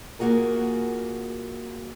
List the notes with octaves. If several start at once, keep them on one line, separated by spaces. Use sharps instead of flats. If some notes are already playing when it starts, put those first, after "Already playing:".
A#3 F4 F#4 G#4 A#4